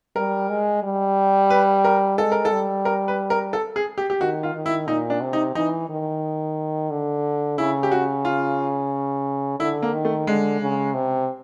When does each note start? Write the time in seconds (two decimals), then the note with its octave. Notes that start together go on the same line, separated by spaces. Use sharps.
0.16 G3 A#4
0.49 G#3
0.83 G3
1.50 B4
1.84 A#4
2.18 G#3 A4
2.32 A#4
2.45 A4
2.52 G3
2.85 A#4
3.08 B4
3.30 A#4
3.53 A4
3.76 G#4
3.98 G4
4.10 G4
4.20 D#3 F#4
4.43 F4
4.54 D#3
4.66 E4
4.88 A#2 D#4
5.10 D4
5.22 C3
5.33 D#4
5.55 E3 D#4
5.89 D#3
6.90 D3
7.58 C#3 E4
7.83 G4
7.91 F#4
8.25 F4
9.60 D3 E4
9.82 A#3
9.93 D#3
10.05 A3
10.27 D3 G#3
10.61 C#3
10.94 C3